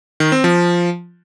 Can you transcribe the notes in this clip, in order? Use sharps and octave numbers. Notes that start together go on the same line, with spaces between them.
D#3
C4
F3